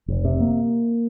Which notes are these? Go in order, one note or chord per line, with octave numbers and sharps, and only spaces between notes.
F1
C3
A#3